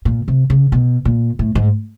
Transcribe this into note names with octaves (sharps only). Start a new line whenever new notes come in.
A#2
C3
C#3
B2
A#2
A2
G#2